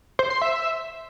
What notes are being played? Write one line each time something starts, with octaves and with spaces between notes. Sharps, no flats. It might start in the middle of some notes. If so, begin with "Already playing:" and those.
C5
C6
E5